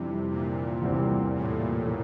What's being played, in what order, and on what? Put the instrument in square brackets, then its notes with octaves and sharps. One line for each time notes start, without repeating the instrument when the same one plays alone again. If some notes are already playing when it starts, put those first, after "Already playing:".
Already playing: [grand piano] F2 E3 G3 D4 G4 [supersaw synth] C3
[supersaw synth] A#2
[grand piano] E2 C3 E3 G3 C4
[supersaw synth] A2
[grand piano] E3 A#3